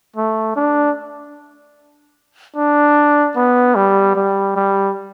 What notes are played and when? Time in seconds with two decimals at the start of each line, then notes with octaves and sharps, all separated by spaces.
0.16 A3
0.56 D4
2.56 D4
3.36 B3
3.75 G3
4.16 G3
4.56 G3